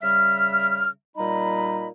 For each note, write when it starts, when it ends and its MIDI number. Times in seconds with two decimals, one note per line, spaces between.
0.02 0.89 49
0.02 0.89 55
0.02 0.89 76
0.02 0.89 89
1.17 1.89 46
1.17 1.89 55
1.17 1.89 63
1.17 1.89 75
1.17 1.89 83